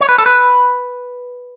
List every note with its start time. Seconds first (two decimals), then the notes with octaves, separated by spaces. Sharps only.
0.01 C#5
0.09 B4
0.18 A4
0.26 B4